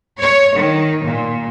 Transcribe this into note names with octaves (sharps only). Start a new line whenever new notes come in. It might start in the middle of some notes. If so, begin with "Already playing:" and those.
C#5
D#3
A#2